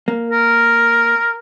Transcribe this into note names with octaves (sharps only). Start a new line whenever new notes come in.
A#3
A#4